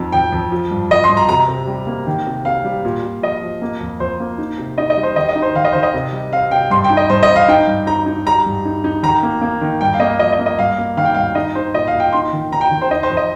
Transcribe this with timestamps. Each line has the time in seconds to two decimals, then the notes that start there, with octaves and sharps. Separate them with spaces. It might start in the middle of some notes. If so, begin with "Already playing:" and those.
Already playing: F2 D#4
0.12 F2 G5
0.32 F2
0.52 F3
0.71 G2
0.91 F3 D#5
1.04 C6
1.09 G2
1.17 A#5
1.29 C3 A#5
1.48 C3
1.67 G3
1.87 A#3
2.07 D#3
2.27 C3
2.45 C3 F5
2.64 G3
2.85 A#2
3.03 A#2
3.22 F3 D#5
3.43 F3
3.62 A#3
3.80 F2
4.00 F2 C5
4.20 A#3
4.38 D#4
4.58 C3
4.78 D#4 D#5
4.90 D#5
4.97 G3
5.03 C5
5.16 D#3 D#5
5.29 D#5
5.35 D#4
5.42 C5
5.55 D#3 F5
5.64 D#5
5.72 D#3 C5
5.83 D#5
5.94 C3
6.13 G3
6.33 C4 F5
6.51 C3 G5
6.71 G2 C6
6.84 G5
6.90 D#4
6.97 D#5
7.10 G2 C5
7.23 D#5
7.29 C4
7.36 F5
7.48 D#4 G5
7.67 G2
7.87 D#4 A#5
8.06 D#4
8.26 G3 A#5
8.46 G2
8.65 D#4
8.84 D#4
9.03 D#3 A#5
9.23 A#3
9.42 A#3
9.61 D#3
9.81 G2 G5
9.94 F5
10.00 A#3 D#5
10.19 F3 D#5
10.32 D#5
10.39 A#3
10.46 D#5
10.59 G2 F5
10.78 A#3
10.97 D#3 F5
11.05 G5
11.14 G2 F5
11.35 D#4 D#5
11.55 D#4 C5
11.74 A#2 D#5
11.87 F5
11.93 A#2
12.00 G5
12.13 D#4 C6
12.33 D#3
12.52 D#3 A#5
12.61 G5
12.71 D#3
12.81 C5
12.90 D#4 D#5
13.03 C5
13.10 F2
13.17 D#5